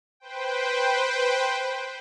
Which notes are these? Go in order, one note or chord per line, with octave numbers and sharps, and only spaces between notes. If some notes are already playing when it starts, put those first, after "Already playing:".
B4 C5 G5